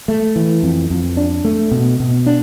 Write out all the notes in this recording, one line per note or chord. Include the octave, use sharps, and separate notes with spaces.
A3
E3
F2
F2
D4
A3
B2
B2
D4